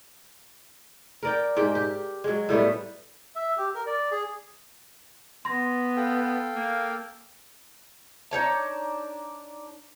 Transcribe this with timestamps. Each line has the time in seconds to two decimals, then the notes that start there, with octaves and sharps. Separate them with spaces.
1.23 A#4 D5 G5
1.57 G#2 G4 G5
1.75 G4
2.24 F#3 G#3
2.49 A2 G3 A3 B3
3.35 E5
3.57 G4
3.75 A#4
3.87 D5
4.11 G#4
5.45 B3 C6 A#6
5.96 A4 F5 G5
6.55 A#3
8.31 D4 D#4 C#5 A5